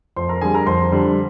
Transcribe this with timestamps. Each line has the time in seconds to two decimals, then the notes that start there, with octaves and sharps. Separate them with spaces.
0.16 F2 C5 C6
0.29 A#4 A#5
0.41 D3 G3 G#4 G#5
0.54 A#4 A#5
0.67 F2 C5 C6
0.92 D3 G3